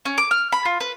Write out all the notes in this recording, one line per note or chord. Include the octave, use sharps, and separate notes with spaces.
C#4
D6
F6
B5
F4
B4